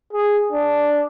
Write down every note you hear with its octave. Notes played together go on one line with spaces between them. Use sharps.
G#4
D4